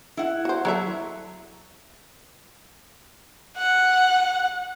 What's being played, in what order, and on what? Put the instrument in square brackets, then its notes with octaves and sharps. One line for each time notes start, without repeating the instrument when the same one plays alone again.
[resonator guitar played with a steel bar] E4 F#5
[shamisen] F#4 C5
[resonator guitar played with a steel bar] F#3 [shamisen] E4 A4 E5
[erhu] F#5